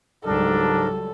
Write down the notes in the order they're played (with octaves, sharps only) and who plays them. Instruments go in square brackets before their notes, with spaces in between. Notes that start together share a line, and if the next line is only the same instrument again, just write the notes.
[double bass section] C#2 F#3 G3 [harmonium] G#2 A#4 [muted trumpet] D4 [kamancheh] A4